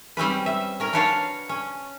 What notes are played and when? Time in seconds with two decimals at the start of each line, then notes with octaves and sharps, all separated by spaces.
0.17 G3 C4 C#4 B4
0.46 E5
0.80 C#4 A#4
0.93 D4 F#4 B4 C#5 F5 A5
1.49 C#4